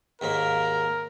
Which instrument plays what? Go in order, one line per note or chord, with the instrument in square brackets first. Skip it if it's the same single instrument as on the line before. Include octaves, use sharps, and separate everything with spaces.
[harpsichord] D#2 G#2 A#3 [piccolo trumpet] A#4